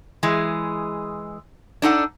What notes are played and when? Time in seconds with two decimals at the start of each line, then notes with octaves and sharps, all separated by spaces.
0.23 E3 G#3 G#4
1.82 D4 D#4 A4 F#5